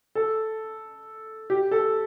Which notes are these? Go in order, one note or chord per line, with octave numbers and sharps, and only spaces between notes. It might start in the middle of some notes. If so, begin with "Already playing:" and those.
A4
G4
A4